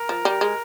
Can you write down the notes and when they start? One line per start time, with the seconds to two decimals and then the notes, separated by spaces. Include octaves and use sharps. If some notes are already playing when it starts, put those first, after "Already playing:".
Already playing: A#4
0.09 F3
0.25 G3
0.41 G#3